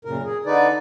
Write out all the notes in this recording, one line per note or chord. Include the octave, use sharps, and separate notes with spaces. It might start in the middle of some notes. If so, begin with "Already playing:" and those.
F#2 A#2 C#3 A#4
G#4
D3 D#4 B4 D5